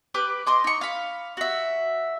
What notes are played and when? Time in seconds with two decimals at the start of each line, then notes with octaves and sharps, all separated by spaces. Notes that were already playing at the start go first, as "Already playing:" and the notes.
0.14 G4 B4 D6
0.47 D#5 C6 D6
0.64 D#4 C#6
0.81 F5 B5
1.37 F#4 E5